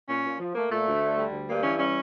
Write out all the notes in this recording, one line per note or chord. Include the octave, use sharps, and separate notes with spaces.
A#2 C#4
A#2
F3
A3 A#3
A#2 A3
D2
D3
G3
D2
G2 A#3
E3 C#4
G3 C#4